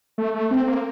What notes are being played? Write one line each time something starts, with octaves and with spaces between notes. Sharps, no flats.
A3
A3
C4
A#3